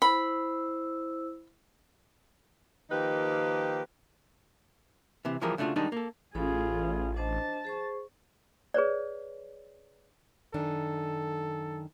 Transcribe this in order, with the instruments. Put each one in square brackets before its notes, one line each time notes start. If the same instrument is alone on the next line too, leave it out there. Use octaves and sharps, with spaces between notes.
[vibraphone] E4 C5 E6 [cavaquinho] B5
[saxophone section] D#3 F3 A#3 D#4 G4 B4
[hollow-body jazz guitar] C3 E3
B1 E3 F3 G3 G#4 A#4
C#3 A3 D4 D#4 F4 F#4
D#3 G3 G#3 D4 D#4
A#3 A4
[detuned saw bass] A1 [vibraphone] C#4 A4 B5 [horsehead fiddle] F4 G#4
[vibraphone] D4 C5 D#5 [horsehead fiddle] A5
[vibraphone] G#4 C5 C#6
[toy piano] G#4 B4 C#5 D5
[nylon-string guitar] F#2 D#3 D4 [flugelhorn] A4